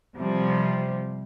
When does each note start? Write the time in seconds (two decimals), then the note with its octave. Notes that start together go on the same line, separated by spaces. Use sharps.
0.16 C3 F3 G3